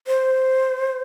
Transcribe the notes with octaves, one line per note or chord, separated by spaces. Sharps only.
C5